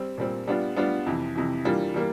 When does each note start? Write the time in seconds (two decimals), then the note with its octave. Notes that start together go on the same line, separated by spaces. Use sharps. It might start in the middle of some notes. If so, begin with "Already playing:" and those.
Already playing: G3 C4
0.18 A#2 G3 C4
0.47 G3 B3 D4 F4
0.76 G3 B3 D4 F4
1.06 F2 C3 E3
1.36 F2 C3 E3
1.65 E3 G3 A#3 D4 F4
1.94 E3 G3 A#3